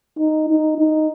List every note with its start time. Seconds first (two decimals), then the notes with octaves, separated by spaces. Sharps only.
0.19 D#4
0.48 D#4
0.78 D#4